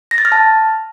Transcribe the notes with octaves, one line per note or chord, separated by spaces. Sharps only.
A#6
A6
F6
A5